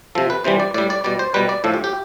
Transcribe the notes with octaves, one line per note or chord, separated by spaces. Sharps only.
C3 F3 A4
B4
C3 E3 G3 C5
D5
A2 G3 D5
D5
B2 G3 D5
C5
B2 G3 B4
D5
A2 F3 A4
G4
G4